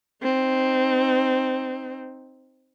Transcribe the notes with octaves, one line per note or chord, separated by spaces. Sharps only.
C4 D#4